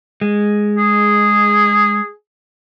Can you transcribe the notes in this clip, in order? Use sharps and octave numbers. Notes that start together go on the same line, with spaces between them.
G#3
G#4